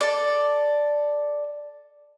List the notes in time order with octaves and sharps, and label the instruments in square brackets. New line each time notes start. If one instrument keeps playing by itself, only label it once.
[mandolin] A4 D5